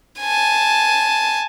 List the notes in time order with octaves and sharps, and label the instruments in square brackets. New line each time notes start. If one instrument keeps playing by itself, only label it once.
[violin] G#5 A5